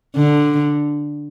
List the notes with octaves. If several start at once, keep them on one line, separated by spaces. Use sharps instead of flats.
D3